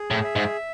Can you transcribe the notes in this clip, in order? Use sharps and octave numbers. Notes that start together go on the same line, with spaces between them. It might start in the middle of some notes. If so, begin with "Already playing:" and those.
Already playing: G#4
A2
E5
G#2